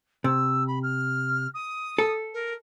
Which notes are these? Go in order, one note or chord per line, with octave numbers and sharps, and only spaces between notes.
C3 E6
B5
F6
D#6
A4
A#4